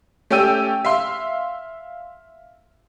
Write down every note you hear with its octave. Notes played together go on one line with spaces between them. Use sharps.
A3 C#4 G4 G5 E6 D#7
E5 F5 C6